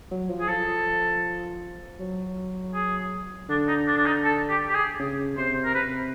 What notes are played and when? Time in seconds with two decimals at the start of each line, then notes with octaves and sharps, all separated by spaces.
0.11 F#3
0.30 F3
0.40 G#4
0.48 F3 A4
2.00 F#3
2.74 G#4
3.49 D3 D4
3.68 D#4
3.87 D4
3.98 D4
4.06 D#4
4.25 A4
4.49 G4
4.70 G4
4.75 G#4
4.99 C#3
5.37 C3 C5
5.65 A#4
5.75 C3 B4